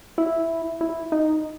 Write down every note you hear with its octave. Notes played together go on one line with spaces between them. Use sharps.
E4
E4
D#4